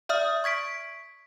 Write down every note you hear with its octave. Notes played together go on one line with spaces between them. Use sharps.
D5 E5 D#6 F6
C#6 G#6 B6 D7